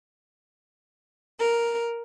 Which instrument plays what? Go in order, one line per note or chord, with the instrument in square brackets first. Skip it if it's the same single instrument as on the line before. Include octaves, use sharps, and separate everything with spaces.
[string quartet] A#4